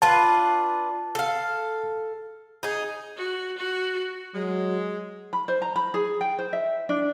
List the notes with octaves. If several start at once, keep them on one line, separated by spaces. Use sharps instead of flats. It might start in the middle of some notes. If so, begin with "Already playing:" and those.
D4 F4 B4 A5
A4 F5
D#4 G#4
F#4
F#4
F#3 G#3
B5
C5
A#5
B5
G#4
G5
C5
E5
D4